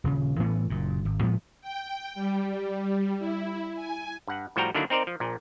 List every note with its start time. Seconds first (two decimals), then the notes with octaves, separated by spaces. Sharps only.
0.04 D#1 C#3
0.39 A2 E3 A3 B3
0.70 F#1 A#2
1.05 G#1
1.22 A2 F3 G#3 B3
1.61 G5
2.15 G3
3.19 E4
3.76 G#5
4.27 G2 F#5
4.56 A2 F3 G3 F#4 G5 A#5
4.75 D3 D#3 F#3 A#3 D4 E4
4.90 C4 D#4 A#4 C5 D5
5.07 F3
5.20 A#1 A#2